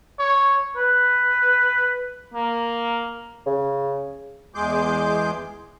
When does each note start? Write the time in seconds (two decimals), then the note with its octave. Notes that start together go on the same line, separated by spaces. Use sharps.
0.19 C#5
0.76 B4
2.34 A#3
3.46 C#3
4.55 E2 G#3 G#4 C6 D6 G6